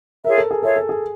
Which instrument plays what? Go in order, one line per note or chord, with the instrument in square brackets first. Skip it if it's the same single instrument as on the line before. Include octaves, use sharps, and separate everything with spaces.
[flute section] F4 G#4 C#5 E5 [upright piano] A#4
[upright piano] A4
G#4
[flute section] F4 G#4 C#5 E5 [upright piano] A4
[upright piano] A4
G#4